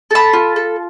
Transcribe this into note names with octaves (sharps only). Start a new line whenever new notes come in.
A4 A5 B5
F4
A4